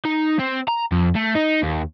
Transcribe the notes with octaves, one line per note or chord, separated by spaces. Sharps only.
D#4
C4
A#5
F2
A3
D#4
D#2